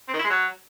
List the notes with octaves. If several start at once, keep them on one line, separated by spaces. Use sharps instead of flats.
C4
D#3
E4
G#3
F#3